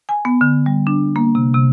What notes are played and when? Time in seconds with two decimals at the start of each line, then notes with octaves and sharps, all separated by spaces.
0.09 G#5
0.25 B3
0.41 D3
0.66 G3
0.87 D4
1.16 A#3
1.35 C3
1.54 C3